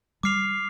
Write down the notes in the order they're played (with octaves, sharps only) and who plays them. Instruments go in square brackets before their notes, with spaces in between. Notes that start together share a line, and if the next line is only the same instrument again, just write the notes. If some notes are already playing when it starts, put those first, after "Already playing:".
[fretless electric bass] G3 [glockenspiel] D6 F6 C7 F7